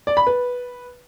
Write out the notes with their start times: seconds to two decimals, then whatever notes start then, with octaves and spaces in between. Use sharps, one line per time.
0.07 D5
0.17 B5
0.27 B4